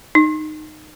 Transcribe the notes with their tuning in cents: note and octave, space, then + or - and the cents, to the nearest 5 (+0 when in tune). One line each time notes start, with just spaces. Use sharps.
D#4 -15